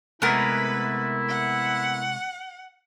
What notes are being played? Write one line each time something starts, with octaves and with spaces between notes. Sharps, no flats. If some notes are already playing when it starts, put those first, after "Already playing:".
C3 G#3 A3 B3 E4 A#4 B4
F#5